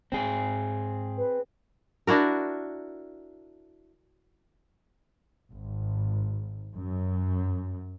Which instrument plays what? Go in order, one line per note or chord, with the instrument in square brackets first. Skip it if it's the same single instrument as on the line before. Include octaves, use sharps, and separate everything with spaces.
[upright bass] G#2 [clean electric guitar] C4 G#4
[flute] B4
[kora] D4 E4 F#4 A#4
[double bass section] G#1
F#2